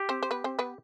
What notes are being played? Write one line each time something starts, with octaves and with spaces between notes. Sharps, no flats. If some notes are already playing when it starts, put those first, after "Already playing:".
Already playing: G4
C4 C5
C5
B3 B4
C4 C5
B3 B4